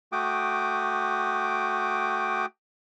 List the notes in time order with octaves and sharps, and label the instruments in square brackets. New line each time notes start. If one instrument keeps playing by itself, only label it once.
[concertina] A3 F#4 G5 D6 D#6